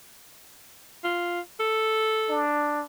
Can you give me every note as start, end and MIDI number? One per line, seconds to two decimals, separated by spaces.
1.04 1.40 65
1.59 2.41 69
2.29 2.84 62